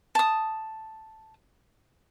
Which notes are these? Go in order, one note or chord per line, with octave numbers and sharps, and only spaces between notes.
A5 D#6